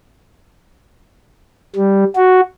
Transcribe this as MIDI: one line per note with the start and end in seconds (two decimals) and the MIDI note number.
1.76 2.04 55
2.16 2.41 66